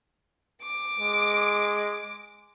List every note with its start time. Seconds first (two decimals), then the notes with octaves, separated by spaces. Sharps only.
0.62 D6
0.99 G#3